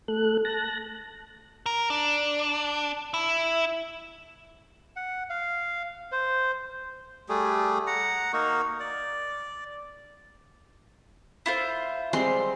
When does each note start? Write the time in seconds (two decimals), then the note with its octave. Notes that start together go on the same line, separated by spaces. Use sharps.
0.08 A3 A4 F#6
0.45 A5 F#6 A#6
1.66 A#4
1.90 D4
3.14 E4
4.96 F#5
5.30 F5
6.12 C5
7.29 G3 A3 G#4
7.87 F#5 A#5
8.33 A#3 D#4 F#4
8.80 D5
11.46 E4 F4 C5
12.13 G3 G#3 C4 C6